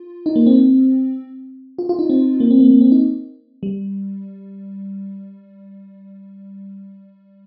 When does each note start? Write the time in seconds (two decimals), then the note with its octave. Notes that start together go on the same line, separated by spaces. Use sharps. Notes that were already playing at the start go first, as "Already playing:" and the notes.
Already playing: F4
0.26 D#4
0.36 A#3
0.46 C4
1.78 F4
1.89 F4
1.99 D#4
2.09 C4
2.40 A#3
2.51 C4
2.60 A#3
2.71 A#3
2.81 C4
2.92 D#4
3.63 G3